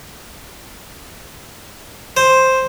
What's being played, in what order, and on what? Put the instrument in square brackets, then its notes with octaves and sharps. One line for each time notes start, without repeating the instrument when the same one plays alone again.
[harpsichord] C5